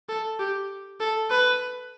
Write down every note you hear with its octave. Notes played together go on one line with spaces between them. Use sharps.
A4
G4
A4
B4